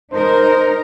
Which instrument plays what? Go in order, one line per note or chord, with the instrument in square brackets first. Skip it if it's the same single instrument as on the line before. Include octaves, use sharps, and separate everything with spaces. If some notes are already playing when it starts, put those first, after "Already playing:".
[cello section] D#4 A#4 [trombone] C5